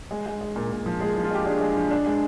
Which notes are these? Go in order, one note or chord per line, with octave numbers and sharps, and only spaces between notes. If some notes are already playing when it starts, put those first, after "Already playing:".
G#3
G#3
G#3
A#2
A#2
F3
G#3 G#4
F3
F4
G#3 G4
D4 G#4
G#3
F3
D4
G#3